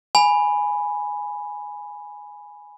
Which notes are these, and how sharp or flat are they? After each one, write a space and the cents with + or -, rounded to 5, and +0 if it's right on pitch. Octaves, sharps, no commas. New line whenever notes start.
G#5 +0 B5 +0